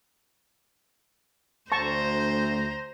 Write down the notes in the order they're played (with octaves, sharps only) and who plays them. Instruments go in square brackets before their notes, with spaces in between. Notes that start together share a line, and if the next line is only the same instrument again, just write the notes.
[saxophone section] D2 [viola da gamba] C5 [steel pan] A5 C#6 [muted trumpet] A#5